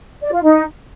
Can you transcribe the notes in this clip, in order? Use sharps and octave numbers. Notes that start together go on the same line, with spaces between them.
D5
F4
D#4